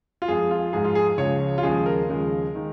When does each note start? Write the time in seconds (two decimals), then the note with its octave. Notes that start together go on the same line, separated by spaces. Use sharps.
0.22 F4
0.28 F2 F3 G#3 G#4
0.51 F4
0.73 G#2 F3 G#3 G#4
0.84 F4
0.95 G#4
1.18 C#2 C#3 F3 G#3 C#5
1.58 F4
1.63 D#2 C#3 F3 G#3 G#4
1.86 A#4
2.09 D#2 C#3 F3 G#3
2.55 D#3 G#3